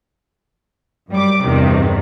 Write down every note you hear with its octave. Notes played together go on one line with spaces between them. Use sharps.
F#2 G3 D6
E2 G2 C3 D#3